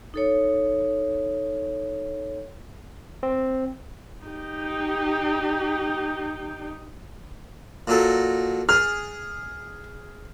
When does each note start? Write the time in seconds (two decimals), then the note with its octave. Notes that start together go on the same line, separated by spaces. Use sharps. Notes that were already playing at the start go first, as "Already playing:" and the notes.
0.14 D#4 A4 C#5
3.23 C4
4.26 D#4 G4
7.88 A#2 F#3 A4
8.69 G#4 F6